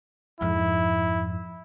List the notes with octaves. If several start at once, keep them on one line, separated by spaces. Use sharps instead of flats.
F2 G#2 E4